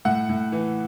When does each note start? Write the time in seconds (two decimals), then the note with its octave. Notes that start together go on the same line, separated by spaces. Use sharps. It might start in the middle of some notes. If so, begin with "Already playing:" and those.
0.05 A2 F#5
0.29 A2
0.52 E3